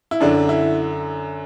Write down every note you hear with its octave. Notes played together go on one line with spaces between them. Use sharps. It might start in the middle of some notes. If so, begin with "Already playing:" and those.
E4
F#2 D3 D4
E4